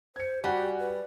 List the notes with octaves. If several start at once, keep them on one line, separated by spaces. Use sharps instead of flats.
C5 G#6 C#7
G3 F#4 G4 F#5 G#5
B4